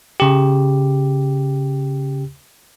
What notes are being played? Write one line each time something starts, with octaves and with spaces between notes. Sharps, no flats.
C#3 G4